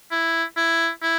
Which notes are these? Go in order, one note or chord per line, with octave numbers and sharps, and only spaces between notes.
E4
E4
E4